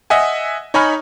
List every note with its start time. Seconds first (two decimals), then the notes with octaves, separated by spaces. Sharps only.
0.10 D#5 E5 F#5 G#5
0.74 D#4 C#5 D#5 G#5 B5 F6